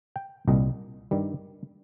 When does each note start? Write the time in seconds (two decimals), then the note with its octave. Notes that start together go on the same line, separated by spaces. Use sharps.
0.16 G5
0.48 C2 A#2 G3 D#5
1.11 G2 D#3 G3